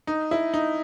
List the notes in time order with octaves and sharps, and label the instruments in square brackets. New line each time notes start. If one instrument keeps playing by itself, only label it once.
[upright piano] D#4
E4
D#4